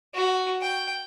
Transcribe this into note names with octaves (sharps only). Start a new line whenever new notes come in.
F#4
G5